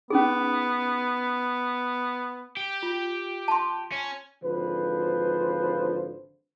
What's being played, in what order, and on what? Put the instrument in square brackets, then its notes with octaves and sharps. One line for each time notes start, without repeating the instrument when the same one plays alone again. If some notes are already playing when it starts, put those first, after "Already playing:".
[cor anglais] B3 [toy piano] C#4 D#4 G#4
[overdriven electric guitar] G4
[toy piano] F4
A5 C6
[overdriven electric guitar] C#4
[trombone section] G#1 D3 F3 B4 C5